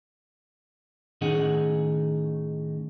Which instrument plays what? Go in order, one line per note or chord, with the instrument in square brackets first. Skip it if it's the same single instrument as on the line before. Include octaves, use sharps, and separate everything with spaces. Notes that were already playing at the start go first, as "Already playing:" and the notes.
[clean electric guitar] A2 D#3 C#4 D#4 G#4 F#5